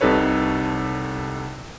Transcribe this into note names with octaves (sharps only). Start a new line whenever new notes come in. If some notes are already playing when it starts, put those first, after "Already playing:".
C2 C3 D#4 A4 B4 C#5